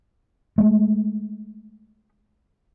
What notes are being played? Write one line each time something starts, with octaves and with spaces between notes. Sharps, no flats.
G#3 A3